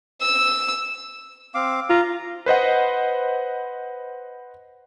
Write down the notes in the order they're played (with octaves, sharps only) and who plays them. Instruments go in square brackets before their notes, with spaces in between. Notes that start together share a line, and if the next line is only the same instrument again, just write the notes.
[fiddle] E6
[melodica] C4 F5 D6
[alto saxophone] F4 [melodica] A#5
[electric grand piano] B4 C5 D#5 F#5